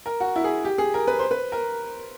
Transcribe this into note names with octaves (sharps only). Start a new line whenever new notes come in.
A#4
F#4
E4
G#4
G4
G#4
A#4
B4
C5
B4
A#4